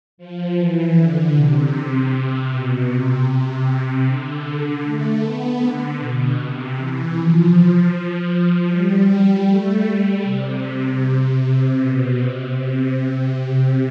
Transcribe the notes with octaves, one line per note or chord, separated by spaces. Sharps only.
F3
E3
D3
C3
B2
C3
C3
D3
A3
B3
D3
B2
C3
E3
F3
G3
A3
G3
C3
B2
C3
C3